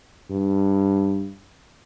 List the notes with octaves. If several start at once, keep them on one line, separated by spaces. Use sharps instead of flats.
G2